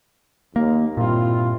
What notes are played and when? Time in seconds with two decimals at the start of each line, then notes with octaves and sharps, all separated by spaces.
0.56 D#2 A#3
0.97 G2 A#2 C4 E4 F4